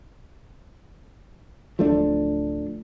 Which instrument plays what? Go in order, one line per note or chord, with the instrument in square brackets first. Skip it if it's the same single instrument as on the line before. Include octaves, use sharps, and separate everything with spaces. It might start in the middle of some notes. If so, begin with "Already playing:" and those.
[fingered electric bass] D1 [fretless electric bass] F3 A3 D4